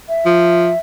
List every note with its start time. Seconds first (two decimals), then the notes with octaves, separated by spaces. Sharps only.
0.09 E5
0.26 F3